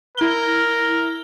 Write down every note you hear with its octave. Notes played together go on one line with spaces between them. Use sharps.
E4 A#4 G7